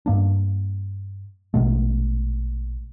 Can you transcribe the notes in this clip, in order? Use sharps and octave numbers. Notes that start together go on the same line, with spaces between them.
G2 A#3 D4
A#1 B2 G#3 A3